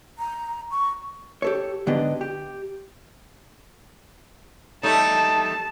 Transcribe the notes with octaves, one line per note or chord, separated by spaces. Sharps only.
A#5
C#6
G4 A4 C#5
G#2 D3 B3 D4 G4 D#5
G4
G3 A3 D#4 A5